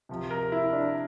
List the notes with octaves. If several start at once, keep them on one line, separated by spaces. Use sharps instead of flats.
C3 F3
A#4
E4
D4